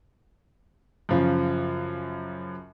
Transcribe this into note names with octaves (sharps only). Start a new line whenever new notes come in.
F#2 C#3 F3